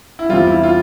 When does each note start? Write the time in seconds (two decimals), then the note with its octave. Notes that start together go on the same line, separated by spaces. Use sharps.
0.19 E4
0.29 E2 C3 G3 F4
0.47 E4
0.63 F4